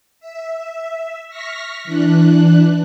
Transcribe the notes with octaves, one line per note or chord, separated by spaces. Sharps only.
E5
C#6 F6 A#6 B6
E3 D4 F#6